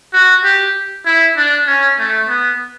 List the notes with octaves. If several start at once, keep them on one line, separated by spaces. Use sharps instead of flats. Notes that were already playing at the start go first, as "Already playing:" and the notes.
F#4
G4
E4
D4
C#4
A3
B3